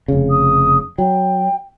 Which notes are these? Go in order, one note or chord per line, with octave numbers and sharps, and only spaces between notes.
F1 C#3
D#6
F#3 G5